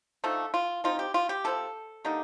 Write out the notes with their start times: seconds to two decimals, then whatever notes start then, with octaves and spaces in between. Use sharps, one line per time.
0.24 D3 F3 A3 D#4 A4
0.54 F4
0.84 F3 C4 D#4 F4
0.99 G4
1.14 F4
1.29 G4
1.44 C3 F3 C4 A4
2.05 D3 G3 A#3 D#4